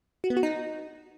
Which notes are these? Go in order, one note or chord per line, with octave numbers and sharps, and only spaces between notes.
F#4
B3
F#4
D#4